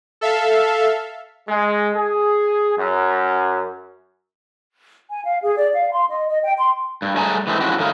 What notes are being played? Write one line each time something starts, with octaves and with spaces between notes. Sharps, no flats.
A4 E5 F5
G#3
G#4
F#2
G#5
F5
G#4
D5
F5
C6
D#5
D#5
G5
C6
G2
F#3 G3 A3 G#4 G#5 A#5
E3 G#3 A3 C4
F3 G#3 C#4 E4 F#4 G4
A2 D#3 D#4 F5